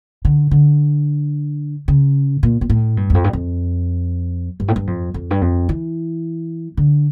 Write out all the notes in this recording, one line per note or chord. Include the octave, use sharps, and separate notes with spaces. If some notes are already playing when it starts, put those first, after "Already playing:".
D3
D3
C#3
A#2
A#2
A2
G2
E2
F2
G2
F2
G2
A2
G2
F2
F2
G2
F2
E3
D3